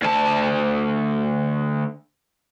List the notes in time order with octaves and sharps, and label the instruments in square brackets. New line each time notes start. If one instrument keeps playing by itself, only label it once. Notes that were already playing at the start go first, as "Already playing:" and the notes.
[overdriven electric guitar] D2 A5